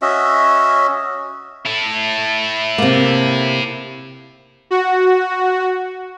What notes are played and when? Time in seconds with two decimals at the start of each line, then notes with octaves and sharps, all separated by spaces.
0.02 C#4 F#4 D#5 E5
1.66 E4 A4
2.78 C3 A#3
4.71 F#4